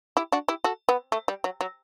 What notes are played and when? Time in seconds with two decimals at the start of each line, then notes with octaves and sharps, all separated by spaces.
0.17 E4 G4
0.32 D4 F#4
0.48 E4 G4
0.64 F#4 A4
0.89 B3
1.12 A3
1.28 G3
1.44 F#3
1.61 F#3